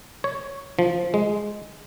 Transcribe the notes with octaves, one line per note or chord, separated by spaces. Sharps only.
C#5
F3
G#3